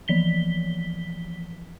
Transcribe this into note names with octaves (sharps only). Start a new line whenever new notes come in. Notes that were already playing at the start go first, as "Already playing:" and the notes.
E3 F3 B6 G7